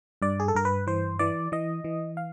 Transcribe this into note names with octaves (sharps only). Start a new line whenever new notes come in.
G2 D5
G#4
A4
G2 A#4
B4
E3 C5
E3 D5
E3 D#5
E3
F5